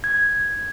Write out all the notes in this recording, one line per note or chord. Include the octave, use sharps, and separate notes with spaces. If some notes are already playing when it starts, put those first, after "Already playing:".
G#6